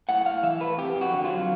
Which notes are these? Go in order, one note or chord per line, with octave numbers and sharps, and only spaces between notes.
A2 F#5
A2 F5
E3 E5
A3 B4
F2 G4
F2
F#4
D3
F4
F#3